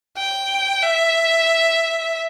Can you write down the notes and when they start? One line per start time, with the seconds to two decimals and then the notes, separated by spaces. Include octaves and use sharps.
0.17 G5
0.82 E5